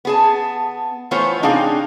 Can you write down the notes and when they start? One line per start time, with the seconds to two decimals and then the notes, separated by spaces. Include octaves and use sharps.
0.05 B3 G#4 A5
1.11 E3 A3 B3 F4 C5 C#5
1.43 C3 D4 D#4 G#4 F5 G5